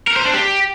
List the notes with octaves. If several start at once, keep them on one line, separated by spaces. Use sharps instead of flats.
A#4
C5
D4
G4